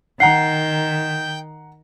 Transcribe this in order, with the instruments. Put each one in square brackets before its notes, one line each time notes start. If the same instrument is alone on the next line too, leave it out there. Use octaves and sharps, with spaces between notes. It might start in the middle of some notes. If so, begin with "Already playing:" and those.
[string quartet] D#3 [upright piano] F#5 A#5 [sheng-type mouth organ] G5 G6 [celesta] C7